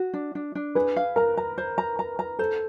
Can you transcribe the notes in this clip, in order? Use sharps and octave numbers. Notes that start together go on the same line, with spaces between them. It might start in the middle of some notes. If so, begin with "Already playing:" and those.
Already playing: F#4
D4
D4
D4
G#4 B4
F5
A#4 A#5
A#5
C5
A#5
A#5
A#5
A4 C5